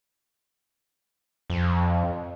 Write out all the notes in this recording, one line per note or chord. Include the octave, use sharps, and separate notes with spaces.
F2